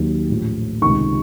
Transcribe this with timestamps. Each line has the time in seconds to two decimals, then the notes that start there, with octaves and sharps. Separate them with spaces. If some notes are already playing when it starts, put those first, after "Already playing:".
Already playing: D#2 D#3 F#3
0.29 A#1 A2 F3
0.81 C#2 C3 D#3 C#6